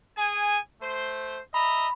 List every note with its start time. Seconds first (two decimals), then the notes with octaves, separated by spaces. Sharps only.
0.17 G#4 G#5
0.82 A3 C5
1.54 D#5 E5 A#5 B5